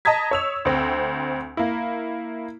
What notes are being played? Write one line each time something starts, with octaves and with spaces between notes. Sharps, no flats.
D#5 A5 A#5 D#6 G#6 B6
C#5 E6 F7
D2 C4 G5
A#3 E4